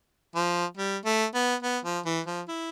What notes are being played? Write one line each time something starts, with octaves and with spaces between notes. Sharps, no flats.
F3
G3
A3
B3
B3
F3
E3
F3
E4